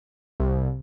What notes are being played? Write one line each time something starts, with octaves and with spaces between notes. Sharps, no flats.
C2